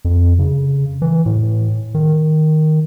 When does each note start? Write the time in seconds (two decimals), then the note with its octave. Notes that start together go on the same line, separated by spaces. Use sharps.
0.05 F2
0.39 C#3
1.02 E3
1.26 A2
1.95 D#3